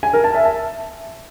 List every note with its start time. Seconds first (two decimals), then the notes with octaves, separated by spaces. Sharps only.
0.03 G#5
0.13 A#4
0.24 A5
0.34 E5
0.45 A5